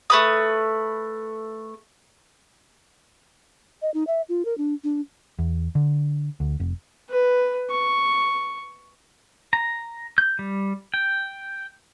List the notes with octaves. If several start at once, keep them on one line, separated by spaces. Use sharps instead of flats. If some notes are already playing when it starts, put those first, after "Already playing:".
A3 B4 D#6
D#5
D#4
E5
F4
A#4
D4
D4
E2
D3
D2
F1
B4
C#6
A#5
G6
G3
G5